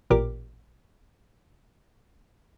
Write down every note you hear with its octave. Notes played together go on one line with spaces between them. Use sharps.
A1 A#2 G4 A#4 D6